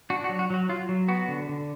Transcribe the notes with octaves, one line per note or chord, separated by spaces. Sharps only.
D4 F#4
F#4
F#3
F#4
F#3 F#4
F#3 F4
F#3
B3 F#4
D3
D3